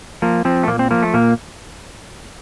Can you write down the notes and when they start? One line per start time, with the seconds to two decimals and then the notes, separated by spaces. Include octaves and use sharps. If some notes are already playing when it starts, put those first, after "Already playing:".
0.22 F3 A#3
0.45 F3 C4
0.63 A3
0.68 A#2 A#3
0.79 C4
0.91 F3 A#3
1.02 A3
1.14 A#2 A#3